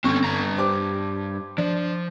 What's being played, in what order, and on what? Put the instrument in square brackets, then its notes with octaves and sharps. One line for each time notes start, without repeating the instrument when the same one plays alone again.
[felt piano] G1 C#6 [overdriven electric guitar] C4 C#4
[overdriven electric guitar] G2 A#5
[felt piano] G4 C5 D6
[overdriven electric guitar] F3 [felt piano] D4